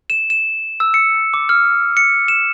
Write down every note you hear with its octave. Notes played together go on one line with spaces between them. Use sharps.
E7
E7
E6
C#7
D6
F6
C#7
E7